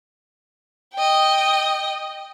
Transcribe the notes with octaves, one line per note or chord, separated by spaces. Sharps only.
D#5 G5